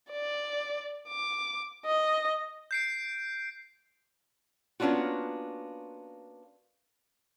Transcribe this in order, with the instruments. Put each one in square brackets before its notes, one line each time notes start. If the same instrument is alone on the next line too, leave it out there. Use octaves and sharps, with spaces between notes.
[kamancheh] D5
D6
D#5
[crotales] G6 C7 D7
[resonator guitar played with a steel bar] A#3 B3 C#4 D4 F4 F#4